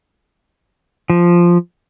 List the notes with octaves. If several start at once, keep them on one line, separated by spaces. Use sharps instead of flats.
F3